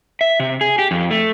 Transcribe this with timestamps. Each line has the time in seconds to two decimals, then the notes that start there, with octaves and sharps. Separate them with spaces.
0.21 E5
0.40 C3
0.61 G#4
0.79 G4
0.91 F2
1.11 A3